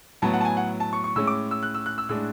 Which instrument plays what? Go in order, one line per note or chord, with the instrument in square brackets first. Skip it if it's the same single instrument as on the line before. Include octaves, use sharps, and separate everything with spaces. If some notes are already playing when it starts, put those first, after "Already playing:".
[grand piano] A2 F#3 B3 A5
F#5
A5
G#5
F#5
A5
C#6
C#6
A2 G#3 C#4 E6
D6
E6
F#6
E6
F#6
E6
A2 G#3 D4 E6